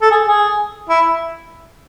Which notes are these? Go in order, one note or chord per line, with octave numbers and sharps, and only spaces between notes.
A4
G#4
G#4
E4